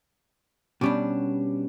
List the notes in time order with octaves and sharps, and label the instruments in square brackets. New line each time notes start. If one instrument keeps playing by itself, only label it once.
[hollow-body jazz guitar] B2 G3 D4 [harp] B3 C#4 G4